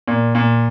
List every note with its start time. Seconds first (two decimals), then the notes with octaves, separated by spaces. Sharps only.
0.08 A#2
0.35 A#2